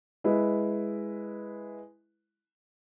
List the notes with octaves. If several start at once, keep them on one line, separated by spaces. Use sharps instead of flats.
G#3 E4 B4